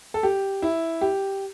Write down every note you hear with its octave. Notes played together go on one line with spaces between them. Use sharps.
A4
G4
E4
G4